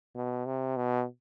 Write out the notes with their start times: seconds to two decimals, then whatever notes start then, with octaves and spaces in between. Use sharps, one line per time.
0.16 B2
0.46 C3
0.76 B2